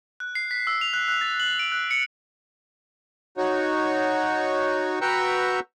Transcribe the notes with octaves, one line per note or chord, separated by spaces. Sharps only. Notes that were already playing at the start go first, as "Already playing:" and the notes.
F#6
C7
B6
E6
F7
F#6
F#6
A6
F#7
D7
F#6
C#7
D#4 F#4 C#5
F#4 B4 G5 A#5 C#6 E6